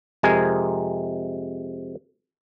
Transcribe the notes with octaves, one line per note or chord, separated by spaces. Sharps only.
F2 C3 G#3 A#4 G#5